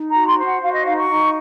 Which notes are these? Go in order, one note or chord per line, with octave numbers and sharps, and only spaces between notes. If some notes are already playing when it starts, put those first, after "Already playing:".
Already playing: D#4
A#5
F#4
C6
C5
F#5
F#4 F5
D#5
D#4 F5
C#6
D#4